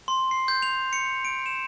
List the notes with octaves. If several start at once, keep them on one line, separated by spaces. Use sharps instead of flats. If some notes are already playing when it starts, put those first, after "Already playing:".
C6
C7
G6
F7
C#7
D7
E7